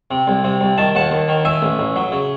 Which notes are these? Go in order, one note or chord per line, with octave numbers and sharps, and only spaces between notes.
C3
C2
C3
C2
D#3 A5
D#2 F#5 A5
D#2
D#3
D#3 E5 G#5
A1
A1
F#3
C#3